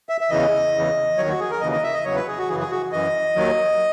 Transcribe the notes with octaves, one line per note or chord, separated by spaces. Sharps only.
E5
E5
E2 C#3 E3 D#5
E2 C#3 E3
D#2 D#3 F#3 C#5
F#4
G#4
A#4
D#2 C#3 E3 D#5
D#5
E5
D#5
E2 C#3 F#3 C#5
B4
G#4
F#4
F#2 C#3 E3 G#4
G#4
F#4
F#2 E3 D#5
D#2 D#3 F#3